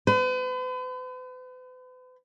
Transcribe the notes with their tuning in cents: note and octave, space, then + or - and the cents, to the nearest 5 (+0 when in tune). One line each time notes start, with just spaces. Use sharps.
B4 +45